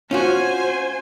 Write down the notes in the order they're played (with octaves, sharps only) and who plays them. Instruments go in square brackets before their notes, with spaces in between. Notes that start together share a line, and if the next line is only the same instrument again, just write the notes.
[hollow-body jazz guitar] C#4 F4 F#4 [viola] C5 G#5